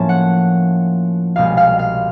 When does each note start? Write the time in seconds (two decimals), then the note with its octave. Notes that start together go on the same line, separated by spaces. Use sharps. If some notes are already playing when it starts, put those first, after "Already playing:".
Already playing: A2 F3 A#3 C#4 A5
0.09 F#5
1.36 C2 B2 G#3 C4 F5
1.57 F5
1.79 F5